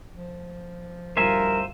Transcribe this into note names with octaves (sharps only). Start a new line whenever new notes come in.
F3
D1 G2 F4 A#4 C5 E5 G#5